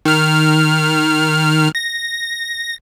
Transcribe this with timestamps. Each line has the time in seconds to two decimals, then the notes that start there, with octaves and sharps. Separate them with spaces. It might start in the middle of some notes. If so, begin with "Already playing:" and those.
0.05 D#3 F6
1.75 A#6